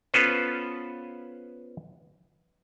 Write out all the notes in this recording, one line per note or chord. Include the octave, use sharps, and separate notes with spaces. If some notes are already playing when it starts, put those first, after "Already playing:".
B3 C#4 F4 A4 B4 C5